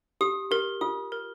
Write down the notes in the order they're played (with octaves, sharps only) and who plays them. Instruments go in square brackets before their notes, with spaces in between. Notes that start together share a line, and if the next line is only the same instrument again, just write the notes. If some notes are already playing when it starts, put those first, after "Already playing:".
[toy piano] G4 [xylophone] D#6
[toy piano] G4 [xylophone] A#4
[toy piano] F4 [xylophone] D#6
[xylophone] A#4